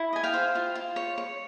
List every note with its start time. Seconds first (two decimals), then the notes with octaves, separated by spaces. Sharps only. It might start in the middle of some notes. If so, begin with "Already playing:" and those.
Already playing: E4
0.13 D#5 G#5
0.23 F5 G5
0.34 C5
0.55 F4
0.75 F4
0.96 C#5
1.18 C#5